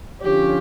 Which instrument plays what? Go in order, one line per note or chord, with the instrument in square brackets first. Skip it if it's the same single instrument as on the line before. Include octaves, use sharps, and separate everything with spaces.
[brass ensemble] D3 F3 C#4 F4 C#5 [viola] G4